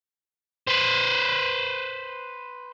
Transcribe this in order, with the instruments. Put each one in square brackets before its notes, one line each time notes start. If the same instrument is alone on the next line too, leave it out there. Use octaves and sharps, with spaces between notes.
[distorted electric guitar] B4 C5